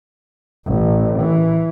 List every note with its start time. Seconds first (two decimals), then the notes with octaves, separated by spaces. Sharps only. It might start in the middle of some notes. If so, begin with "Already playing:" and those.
0.66 A1
1.20 E3